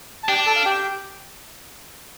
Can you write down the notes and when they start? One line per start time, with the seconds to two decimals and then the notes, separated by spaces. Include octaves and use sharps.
0.23 A5
0.28 D4 G4 G5
0.46 A4 A5
0.56 F5
0.65 G4 G5